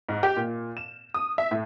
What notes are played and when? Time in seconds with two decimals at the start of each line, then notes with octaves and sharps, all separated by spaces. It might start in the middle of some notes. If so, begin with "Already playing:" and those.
0.09 G#2
0.23 G4
0.36 A#2
0.77 E7
1.14 D#6
1.38 E5
1.51 A2